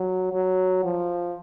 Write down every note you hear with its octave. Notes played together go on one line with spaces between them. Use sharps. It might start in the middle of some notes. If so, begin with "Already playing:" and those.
Already playing: F#3
F#3
F3